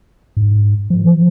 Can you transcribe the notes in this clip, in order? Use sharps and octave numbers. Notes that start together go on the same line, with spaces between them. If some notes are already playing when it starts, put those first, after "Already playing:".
G#2
F3
E3
F3